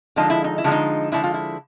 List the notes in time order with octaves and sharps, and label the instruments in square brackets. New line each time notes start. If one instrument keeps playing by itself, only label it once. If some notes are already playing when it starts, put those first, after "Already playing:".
[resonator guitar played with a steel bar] D3 F3 G#3 D#4
E4
D#4
E4
D3 F3 G#3
D#4
D3 F3 G#3 E4
F4
E4